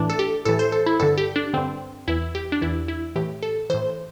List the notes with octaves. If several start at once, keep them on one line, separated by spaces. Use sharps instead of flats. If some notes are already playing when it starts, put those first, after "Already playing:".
Already playing: A2 E3 D4
A4
G4
A2 E3 A4
C5
A4
E4
G2 D3 A4
G4
D4
G2 D3 C4
E2 E3 E4
G4
D4
E2 E3 E4
E4
A2 E3 G4
A4
A2 E3 C5